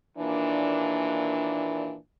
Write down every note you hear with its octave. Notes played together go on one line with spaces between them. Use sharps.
D#2 A#2 E3 D4